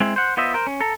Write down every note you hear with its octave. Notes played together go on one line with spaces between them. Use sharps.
G#3 C4 E4
C5 F#5
B3 F4 C5 D#5 E5
A#4 C5
C#4
A4 A#5